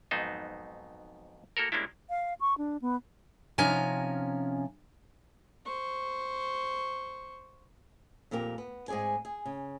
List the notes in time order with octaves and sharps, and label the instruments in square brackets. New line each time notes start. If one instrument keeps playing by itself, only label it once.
[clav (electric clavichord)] F2 G#2 F#3 B3 D#4 C5
A#3 F#4 A4 A#4
G3 G#3 A#3 C#4 D4 E4
[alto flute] F5
C#6
D4
B3
[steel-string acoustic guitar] C3 F3 C#4 D#4 G#5 A#5
[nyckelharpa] C5 C#6
[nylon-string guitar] F2 A#2 G4 A#4
B3
G#2 C4 G#4 D5 G#5
G#4
C#3